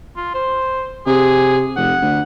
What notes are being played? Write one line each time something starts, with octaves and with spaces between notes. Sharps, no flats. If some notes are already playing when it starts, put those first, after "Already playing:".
F4
C5
C3 G#4
F1 F#5
D2